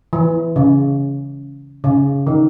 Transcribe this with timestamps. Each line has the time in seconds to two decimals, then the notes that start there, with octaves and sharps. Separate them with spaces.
0.13 E3
0.56 C#3
1.84 C#3
2.27 D#3